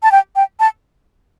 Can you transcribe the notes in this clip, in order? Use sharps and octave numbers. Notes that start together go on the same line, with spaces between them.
A5
G5
G5
A5